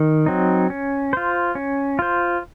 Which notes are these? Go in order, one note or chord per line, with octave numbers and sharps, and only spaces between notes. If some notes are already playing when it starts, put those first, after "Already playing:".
Already playing: D#3
F#3 C4 D#4
C#4
F4 C5
C#4
F4 C5